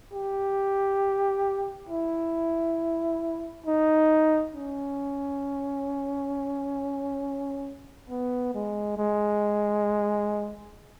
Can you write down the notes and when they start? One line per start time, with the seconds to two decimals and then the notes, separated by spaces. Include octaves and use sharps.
0.12 G4
1.89 E4
3.66 D#4
4.55 C#4
8.10 B3
8.54 G#3
8.98 G#3